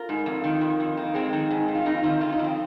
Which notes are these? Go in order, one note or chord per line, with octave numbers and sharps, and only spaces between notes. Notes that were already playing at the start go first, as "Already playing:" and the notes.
Already playing: F4 A#4
G#2
F2
D#3
F2
F2
D#3 A#3
F2 G#3 C4
D#3
G#2
G#2
F4
F2 A#3 D#4
D#3 C4 F4
F2 F4
D#4
F2 C4